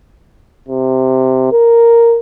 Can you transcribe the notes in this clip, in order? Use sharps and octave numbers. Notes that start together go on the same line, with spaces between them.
C3
A#4